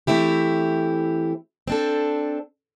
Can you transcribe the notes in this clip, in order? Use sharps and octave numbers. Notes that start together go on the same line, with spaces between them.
E3 A3 C4 E4 G4
C4 D4 A4